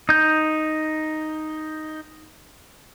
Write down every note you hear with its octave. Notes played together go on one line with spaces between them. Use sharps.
D#4 G6